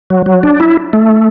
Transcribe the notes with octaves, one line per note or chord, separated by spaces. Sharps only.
F#3
F#3
D4
E4
A3